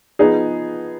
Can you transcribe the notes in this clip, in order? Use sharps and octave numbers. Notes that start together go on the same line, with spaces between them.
F3 B3 D#4 G#4